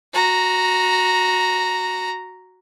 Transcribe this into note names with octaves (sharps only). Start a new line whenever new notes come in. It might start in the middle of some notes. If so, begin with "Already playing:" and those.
F#4 A#5